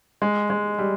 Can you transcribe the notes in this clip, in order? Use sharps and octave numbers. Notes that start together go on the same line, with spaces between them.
G#3
G#3
G3